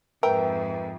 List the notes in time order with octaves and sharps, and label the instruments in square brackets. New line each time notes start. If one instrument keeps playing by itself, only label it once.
[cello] F2 G#2 [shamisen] A#4 [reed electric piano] B4 E5 [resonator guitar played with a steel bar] G5